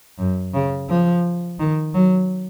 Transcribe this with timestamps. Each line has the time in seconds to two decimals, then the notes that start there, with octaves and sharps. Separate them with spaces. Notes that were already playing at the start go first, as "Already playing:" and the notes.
0.19 F#2
0.54 C#3
0.89 F3
1.59 D#3
1.94 F#3